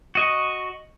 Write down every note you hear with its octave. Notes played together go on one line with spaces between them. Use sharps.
F#4 D#5 C#6